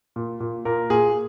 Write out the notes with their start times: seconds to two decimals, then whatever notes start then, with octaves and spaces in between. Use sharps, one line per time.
0.16 A#2
0.40 A#2
0.65 A#2 A#4
0.90 A#2 G#4